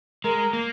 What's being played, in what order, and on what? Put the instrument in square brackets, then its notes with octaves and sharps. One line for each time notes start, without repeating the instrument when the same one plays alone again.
[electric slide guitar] G#3 [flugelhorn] A#4
[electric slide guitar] A#3